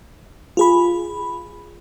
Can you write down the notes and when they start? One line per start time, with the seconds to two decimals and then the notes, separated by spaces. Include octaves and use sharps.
0.57 F4 G#4 B5